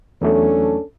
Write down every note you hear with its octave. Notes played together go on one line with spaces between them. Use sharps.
E2 F#3 A3 C#4 D4 A4